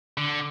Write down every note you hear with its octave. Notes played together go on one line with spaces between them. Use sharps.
D3